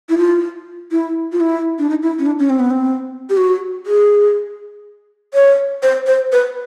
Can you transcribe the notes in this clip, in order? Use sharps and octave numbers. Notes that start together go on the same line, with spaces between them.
E4
F4
E4
F4
E4
D4
D#4
E4
C#4
D4
C#4
C4
B3
C4
G4
F#4
G#4
C#5
C5
C5
B4